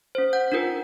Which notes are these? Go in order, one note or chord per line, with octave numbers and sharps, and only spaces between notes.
C#4 C5
F#5 G6
D4 D#4 F4 A#4 B4